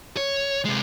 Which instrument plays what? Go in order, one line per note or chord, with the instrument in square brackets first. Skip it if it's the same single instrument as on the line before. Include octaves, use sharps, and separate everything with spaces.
[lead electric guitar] C#5
C3 G#3